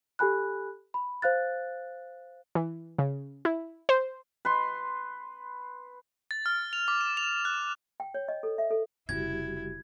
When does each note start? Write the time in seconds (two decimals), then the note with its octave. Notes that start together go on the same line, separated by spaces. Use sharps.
0.19 G4 A4 G#5 B5 F#6
0.94 B5
1.22 C5 F5 F#6 A6
2.55 E3
2.99 C#3
3.45 E4
3.89 C5
4.45 B4 C6
6.31 A6
6.46 F6
6.73 F7
6.88 D6
7.01 E7
7.17 F7
7.45 F#6
8.00 G5
8.14 C#5
8.28 D#5
8.43 A4
8.58 E5
8.71 A4
9.09 F1 C#3 G3 E4 F#4 G4 G#6